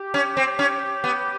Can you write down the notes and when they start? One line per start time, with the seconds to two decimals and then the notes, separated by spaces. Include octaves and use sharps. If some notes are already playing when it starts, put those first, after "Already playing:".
Already playing: G4
0.14 C#4
0.37 C4
0.59 C#4
1.04 B3